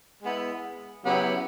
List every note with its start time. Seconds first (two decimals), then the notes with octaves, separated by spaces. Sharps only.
0.23 G#3 B3 E4
1.05 C#3 F#3 B3 E4 G4